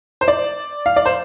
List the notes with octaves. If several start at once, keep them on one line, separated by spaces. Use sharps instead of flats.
C5
D5
F5
D5
C5